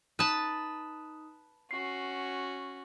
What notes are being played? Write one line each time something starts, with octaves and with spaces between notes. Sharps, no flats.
D#4 B4 A5 D#6
C#4 F#4 C7